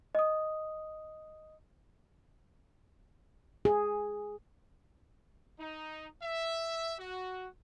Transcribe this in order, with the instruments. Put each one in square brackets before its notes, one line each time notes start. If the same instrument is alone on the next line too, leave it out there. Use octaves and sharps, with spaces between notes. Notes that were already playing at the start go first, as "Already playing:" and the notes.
[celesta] D#5 D#6
[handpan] G#4
[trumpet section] D#4
E5
F#4